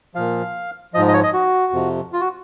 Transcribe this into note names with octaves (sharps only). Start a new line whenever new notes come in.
A#2 F3 F5
G#2 F3 D#5
D#5
C#5
D#5
F#4
F2 C3 F3
F4
F#4